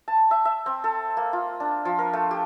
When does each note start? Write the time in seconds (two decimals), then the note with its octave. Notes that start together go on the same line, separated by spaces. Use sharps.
0.08 A5
0.31 E5
0.45 E5
0.66 C4
0.84 A4
1.17 A#3
1.33 F4
1.60 D4
1.85 F3
1.99 A#4
2.13 A3
2.31 G4